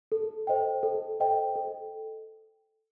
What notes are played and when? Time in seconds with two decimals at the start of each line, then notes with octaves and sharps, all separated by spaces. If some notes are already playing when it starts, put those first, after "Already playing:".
0.12 A4
0.47 C5 D#5 G5
0.83 A4
1.20 C5 D#5 G5
1.56 A4